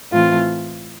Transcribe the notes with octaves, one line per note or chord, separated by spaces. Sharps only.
A2 E3 A3 C4 F4